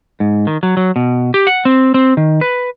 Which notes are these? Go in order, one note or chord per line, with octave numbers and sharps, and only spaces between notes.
G#2
D#3
F#3
F#3
B2
G4
F#5
C4
C4
D#3
B4